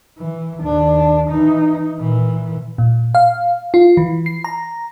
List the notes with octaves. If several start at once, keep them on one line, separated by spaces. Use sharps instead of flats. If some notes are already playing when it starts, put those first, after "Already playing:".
E3
D#2 D4
E3 D#4
A#2 E3
A#2
F5
F4
E3
C7
A#5